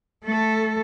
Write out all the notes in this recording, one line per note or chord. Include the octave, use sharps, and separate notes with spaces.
A3 A4